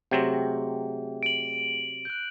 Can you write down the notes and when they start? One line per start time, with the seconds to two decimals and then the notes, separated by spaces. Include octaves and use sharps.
0.11 C3 F#3 A3 C4 G#4 G5
1.23 D7 F#7
2.05 F#6 G6